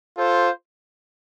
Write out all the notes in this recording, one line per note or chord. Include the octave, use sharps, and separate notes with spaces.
F4 A4 C5